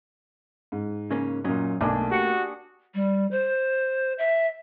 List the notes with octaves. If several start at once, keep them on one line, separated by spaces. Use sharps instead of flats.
G#2
C#3 A#3 C#4
F#2 A#2 F#3 C#4 D#4
B1 A3 A#3 D4 G#4
F#4 G4 C#7
G3
C5
E5